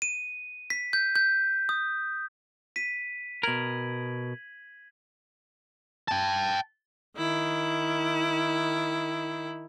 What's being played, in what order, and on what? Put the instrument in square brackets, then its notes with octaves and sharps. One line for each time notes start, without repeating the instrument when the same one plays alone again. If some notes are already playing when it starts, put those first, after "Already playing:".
[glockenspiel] D#7
B6
G6
G6
D#6
B6 D#7
[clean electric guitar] B2 A#4 [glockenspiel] G#6 F#7
[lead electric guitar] G5 A5
[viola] D#3 E4